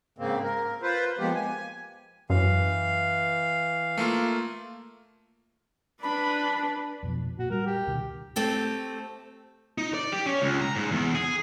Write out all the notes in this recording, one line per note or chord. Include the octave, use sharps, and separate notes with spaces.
G#2 C#3 A#3 C4
A#4
F4 B4 C5
F3 G#3 A#3 B3 G4
G#5
F#2 E3 F5
A3 A#3 F4
D4 B4 B5
F2 B2 F3
A#2 F#4
G3 A#4
G4
D2 B2 D#3
A3 C4 G4 A4
D#4
D5
G4
C#4
C#2
A#5
G#2
E2
G#4